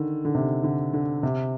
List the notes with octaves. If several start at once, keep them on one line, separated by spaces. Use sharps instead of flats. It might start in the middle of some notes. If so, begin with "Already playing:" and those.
Already playing: D3 D#3
D3
C3
D3
D3
C3